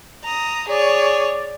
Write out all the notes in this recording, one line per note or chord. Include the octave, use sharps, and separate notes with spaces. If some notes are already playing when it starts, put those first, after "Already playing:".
A#5 D#6
G#4 C#5 D5